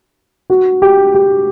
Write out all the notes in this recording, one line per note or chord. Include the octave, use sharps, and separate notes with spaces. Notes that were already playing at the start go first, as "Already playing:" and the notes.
F#4
G4
G4